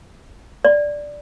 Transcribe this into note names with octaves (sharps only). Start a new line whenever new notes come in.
D5